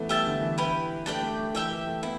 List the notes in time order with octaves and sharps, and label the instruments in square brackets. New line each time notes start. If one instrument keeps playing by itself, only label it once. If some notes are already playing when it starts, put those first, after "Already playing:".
Already playing: [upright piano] E3 A3 B3
[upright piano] G3 [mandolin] G4 E5 A5
[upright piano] D3
E3
[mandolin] E4 G4 B4
[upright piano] A3 [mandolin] D4 G4 D5 G5
[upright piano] A3
A3
[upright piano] E3 [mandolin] G4 E5 G5
[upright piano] E3
A3
[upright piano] B3 [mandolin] E4